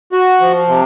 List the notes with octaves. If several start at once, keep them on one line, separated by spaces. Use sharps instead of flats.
F#4
F3
C3